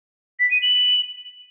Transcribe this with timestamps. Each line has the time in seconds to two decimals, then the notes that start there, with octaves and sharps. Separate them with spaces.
0.40 B6
0.51 D#7
0.62 F#7